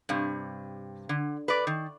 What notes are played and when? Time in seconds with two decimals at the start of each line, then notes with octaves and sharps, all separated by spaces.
0.09 G2 C3
1.09 D3
1.48 B4 D5
1.67 D#3